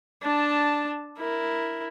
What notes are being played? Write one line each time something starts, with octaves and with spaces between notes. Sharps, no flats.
D4 A5
E4 A#4